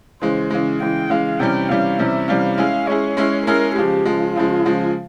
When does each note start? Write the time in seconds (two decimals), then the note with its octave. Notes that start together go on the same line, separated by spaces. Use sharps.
0.21 C#3 E3 G#3 C5
0.50 C#3 E3 G#3
0.80 C#3 E3 G#3 G5
1.10 C#3 E3 G#3 F5
1.39 C3 E3 G3 C#4 G5
1.69 C3 E3 G3 C#4 F5
1.99 C3 E3 G3 C#4 E5
2.28 C3 E3 G3 C#4 F5
2.58 G#3 C#4 E4 G#4 F5
2.87 G#3 C#4 E4 G#4 C#5
3.17 G#3 C#4 E4 G#4
3.46 G#3 C#4 E4 G#4 A#4
3.76 C#3 F3 G#3 G4
4.05 C#3 F3 G#3 F4
4.36 C#3 F3 G#3
4.65 C#3 F3 G#3